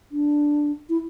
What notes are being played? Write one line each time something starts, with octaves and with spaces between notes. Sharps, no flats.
D4
E4